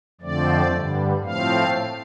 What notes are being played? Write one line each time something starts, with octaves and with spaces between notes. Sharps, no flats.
F2 D3 F3 A3 C4 D5
G2 D3 G3
A2 F3 A3 C4 F5